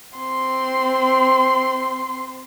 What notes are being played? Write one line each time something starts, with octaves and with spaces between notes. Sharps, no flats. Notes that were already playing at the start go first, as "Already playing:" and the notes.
C4 C6